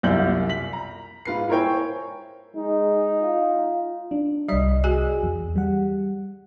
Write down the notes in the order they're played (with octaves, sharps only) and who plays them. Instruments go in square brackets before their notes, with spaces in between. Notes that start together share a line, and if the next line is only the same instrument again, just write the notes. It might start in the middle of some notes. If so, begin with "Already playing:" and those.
[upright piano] C2 F#2 F4 D5 G6 F#7
B6 F#7
A#5
G#2 F4 B4 C7
E4 A#4 C5 C#5 G5 G#5
[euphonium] G#3 [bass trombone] D#4
[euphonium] F4
[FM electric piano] D4
[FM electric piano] C2 D#5 [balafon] G3 D5
[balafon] F#4 G#4 G#5
[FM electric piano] E2
G3 F#5